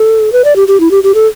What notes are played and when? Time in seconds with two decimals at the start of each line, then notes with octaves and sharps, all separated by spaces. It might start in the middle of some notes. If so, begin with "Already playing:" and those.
Already playing: A4
0.32 B4
0.45 D5
0.56 G4
0.68 G4
0.80 E4
0.91 G4
1.03 G4
1.15 A4